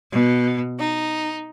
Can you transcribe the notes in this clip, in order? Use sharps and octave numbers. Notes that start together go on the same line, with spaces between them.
B2
D#4